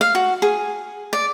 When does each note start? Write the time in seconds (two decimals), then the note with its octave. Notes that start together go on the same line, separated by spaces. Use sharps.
0.01 F5
0.15 F#4
0.42 G#4
1.13 D5